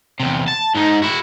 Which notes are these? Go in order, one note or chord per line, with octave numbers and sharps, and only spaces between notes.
E2 C3
A5
G#2 D#4
E4 F#4